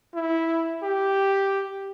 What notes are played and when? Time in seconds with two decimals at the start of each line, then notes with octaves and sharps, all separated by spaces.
0.14 E4
0.83 G4